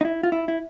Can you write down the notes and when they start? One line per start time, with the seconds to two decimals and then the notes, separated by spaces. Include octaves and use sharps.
0.01 D#4
0.05 E4
0.23 F4
0.32 E4
0.48 E4